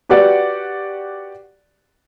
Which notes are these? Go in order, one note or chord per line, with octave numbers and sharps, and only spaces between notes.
F#4 G4 B4 D5 F#5